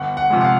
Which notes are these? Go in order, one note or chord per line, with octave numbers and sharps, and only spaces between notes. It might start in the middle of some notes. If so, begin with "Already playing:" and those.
Already playing: G1 F#5
F#5
C3 F3 G#3
F#5
F5